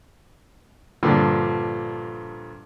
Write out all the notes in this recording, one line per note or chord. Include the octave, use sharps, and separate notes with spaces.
G2 A#2 D3 F3